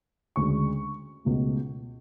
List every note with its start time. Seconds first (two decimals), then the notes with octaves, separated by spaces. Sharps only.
0.36 D2 C#3 G#3 D4 C#6
1.25 C#2 B2 A3